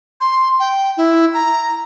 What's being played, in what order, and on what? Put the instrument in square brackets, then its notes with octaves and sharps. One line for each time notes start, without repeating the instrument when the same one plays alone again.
[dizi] C6
G5
E4
A#5